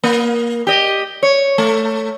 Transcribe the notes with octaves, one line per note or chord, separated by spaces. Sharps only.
A#3
G4 D#5
C#5
A3